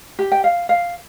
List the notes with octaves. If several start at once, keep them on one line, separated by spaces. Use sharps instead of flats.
G4
G5
F5
F5